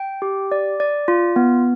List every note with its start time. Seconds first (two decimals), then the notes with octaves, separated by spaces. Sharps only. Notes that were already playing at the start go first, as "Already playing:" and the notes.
Already playing: G5
0.22 G4
0.52 D5
0.80 D5
1.08 F4
1.36 B3